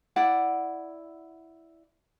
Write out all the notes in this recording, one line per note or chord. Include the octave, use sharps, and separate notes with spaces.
E4 D5 F#5